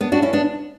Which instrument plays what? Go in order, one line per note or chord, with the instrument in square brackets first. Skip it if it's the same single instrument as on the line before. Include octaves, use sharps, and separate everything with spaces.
[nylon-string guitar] B3 D4
D4 F#4
C#4 E4
B3 D4